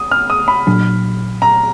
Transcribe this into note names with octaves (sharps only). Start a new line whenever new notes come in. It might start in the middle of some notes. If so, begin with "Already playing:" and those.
Already playing: D#6
F6
D#6
B5
A#2 F#3 D4
A#5